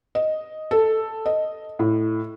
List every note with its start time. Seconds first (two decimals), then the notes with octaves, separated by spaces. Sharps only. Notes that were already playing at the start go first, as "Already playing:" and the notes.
0.15 D#5
0.71 A4
1.26 D#5
1.79 A2